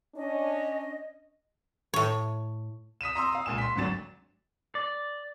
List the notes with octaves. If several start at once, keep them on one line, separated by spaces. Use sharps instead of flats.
C#4 D4 D#5
A2 C#5
D#6 B6 D#7 E7
A#5 C6 D#6 E6
F5 D#6
C#2 A#2 G#5 E7
C6 B6
G#1 D2 D3 F#3 A6 E7
D5